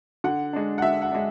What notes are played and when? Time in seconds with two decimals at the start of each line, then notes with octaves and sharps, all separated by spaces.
0.24 D3 F#5
0.53 G#3 D4
0.78 F#5
0.82 D3 E5
1.02 F#5
1.11 G#3 D4